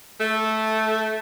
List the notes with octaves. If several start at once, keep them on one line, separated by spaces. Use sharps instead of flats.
A3